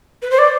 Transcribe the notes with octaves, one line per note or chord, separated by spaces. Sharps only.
B4
C5
D5